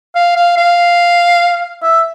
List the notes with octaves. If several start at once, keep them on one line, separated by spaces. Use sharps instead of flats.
F5
F5
F5
E5